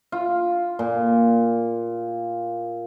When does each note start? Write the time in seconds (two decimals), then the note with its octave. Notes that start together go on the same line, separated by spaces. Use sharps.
0.12 F4
0.79 A#2